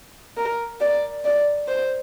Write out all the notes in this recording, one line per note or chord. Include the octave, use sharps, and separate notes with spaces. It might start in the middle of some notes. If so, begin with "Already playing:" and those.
A#4
D5
D5
C5